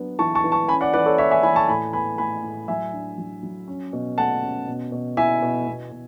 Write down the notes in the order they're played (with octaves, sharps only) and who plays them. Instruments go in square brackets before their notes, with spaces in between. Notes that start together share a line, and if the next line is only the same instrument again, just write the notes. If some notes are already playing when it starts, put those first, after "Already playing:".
Already playing: [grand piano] F#3 B3 D4
E3 A5 C#6
A5 C#6
E3
A5 C#6
C#4 G#5 B5
D5 F#5
E3 B4 D5
A4 C#5
E4 C#5 E5
E5 G#5
E3 G#5 B5
A5 C#6
A2 G#5 B5
B3 G#5 B5
A2 G#5 B5
A2
F#3 E5 G#5
D4
F#3
F#3
C#4
B2
A3 F#5 A5
C#4
B2
B2
E4 E5 G#5
B2
B2
B2